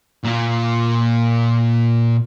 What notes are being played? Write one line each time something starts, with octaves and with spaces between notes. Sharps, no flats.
A#2 F4